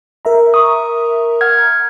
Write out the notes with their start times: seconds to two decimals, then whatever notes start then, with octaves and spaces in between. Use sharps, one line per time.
0.25 A#4 E5 A#5
0.54 C#6 D#6
1.41 F#5 F6 G#6